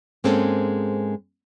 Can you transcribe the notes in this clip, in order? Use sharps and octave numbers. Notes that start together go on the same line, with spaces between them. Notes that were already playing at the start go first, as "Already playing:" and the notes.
G#2 G#3 A#3 C4 C#4 A4